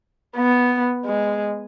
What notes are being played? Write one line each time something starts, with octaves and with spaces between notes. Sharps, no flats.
B3
G#3